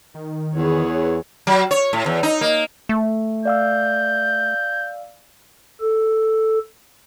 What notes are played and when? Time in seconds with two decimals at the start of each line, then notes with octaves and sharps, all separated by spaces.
0.14 D#3
0.55 E2 G#4 B4 C#5
1.47 F#3
1.71 C#5
1.93 A2
2.06 E2
2.23 D#4
2.41 A#3
2.89 A3
3.45 D5 F5 E6 G6
5.81 A4